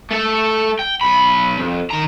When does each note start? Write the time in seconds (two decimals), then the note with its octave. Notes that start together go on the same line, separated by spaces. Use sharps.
0.11 A3 A4
0.79 G5
1.01 B1 B5
1.60 F2
1.90 D#3 A#5